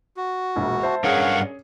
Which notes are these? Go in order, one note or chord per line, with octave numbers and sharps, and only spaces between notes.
F#4
E1 A#1
C5 E5 A5
G2 C#4 G#4 A#4 C#5 F5 F#5